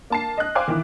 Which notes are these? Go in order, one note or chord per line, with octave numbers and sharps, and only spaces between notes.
A#3 A5 C7
D#5 F#6
C5 F5 G#5 D6 F#6
D#3 E3